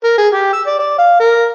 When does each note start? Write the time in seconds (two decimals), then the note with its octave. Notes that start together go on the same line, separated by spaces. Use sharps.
0.04 A#4
0.18 G#4
0.33 G4
0.53 E6
0.67 D5
0.79 D5
0.98 F5
1.20 A#4